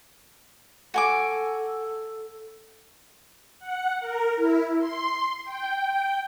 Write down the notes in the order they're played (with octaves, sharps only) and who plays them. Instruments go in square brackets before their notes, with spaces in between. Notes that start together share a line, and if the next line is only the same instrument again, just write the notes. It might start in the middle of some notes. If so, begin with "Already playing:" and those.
[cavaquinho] F#4 G#5 D6 [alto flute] A4
[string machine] F#5
A#4
E4
C6
G5